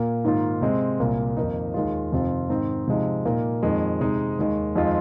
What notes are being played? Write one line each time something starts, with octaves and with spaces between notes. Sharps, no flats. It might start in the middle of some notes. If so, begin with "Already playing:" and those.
Already playing: A#2 A#3
G#2 D#3 A#3 F4
C3 G#3 C4
C2 A#2 A#3
F2 D#3 A#3 D#4
D#2 D#3 G#3 F4
F2 C3 D#3 C4 F4
G#2 D#3 C4 D#4
C3 F3 G#3 D#4
A#2 A#3 D#4
F2 D#3 G#3
C3 G#3 D#4
D#2 D#3 G#3
F2 D#3 G#3 C4 F4